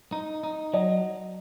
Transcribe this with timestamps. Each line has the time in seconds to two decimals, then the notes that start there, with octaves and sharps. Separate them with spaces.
0.12 D#4
0.43 D#4
0.73 F#3 D#5